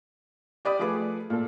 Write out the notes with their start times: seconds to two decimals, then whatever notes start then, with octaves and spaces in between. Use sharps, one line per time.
0.65 G4 D5 B5 D#6
0.79 F3 A3 G#4 B4 D6
1.30 A#2 A4